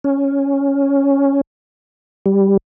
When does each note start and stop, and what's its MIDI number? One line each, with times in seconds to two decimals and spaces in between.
0.04 1.41 61
2.26 2.57 55